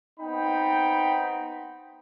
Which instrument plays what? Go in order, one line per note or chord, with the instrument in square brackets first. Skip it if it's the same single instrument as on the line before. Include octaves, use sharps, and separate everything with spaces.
[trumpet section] B3 C4 D#4 G5 B5